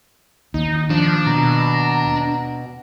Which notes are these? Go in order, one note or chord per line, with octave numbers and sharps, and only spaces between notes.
D#2 D#4
F3 D4
B2 A#5